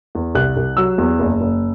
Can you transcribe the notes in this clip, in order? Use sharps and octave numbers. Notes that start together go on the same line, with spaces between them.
E2
C2 F#6
C2
F#3 E6
E2
F#1
F#1